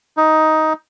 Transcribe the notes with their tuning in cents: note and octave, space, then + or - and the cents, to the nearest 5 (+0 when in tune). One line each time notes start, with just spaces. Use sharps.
D#4 +10